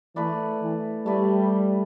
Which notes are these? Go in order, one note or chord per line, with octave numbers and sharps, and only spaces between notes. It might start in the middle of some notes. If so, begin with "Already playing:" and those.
E3 A3 E4 B4 D5
E3
G3 A3 E4 B4 D5